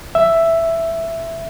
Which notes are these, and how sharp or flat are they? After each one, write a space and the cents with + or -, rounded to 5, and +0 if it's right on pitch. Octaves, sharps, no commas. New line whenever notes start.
E5 +5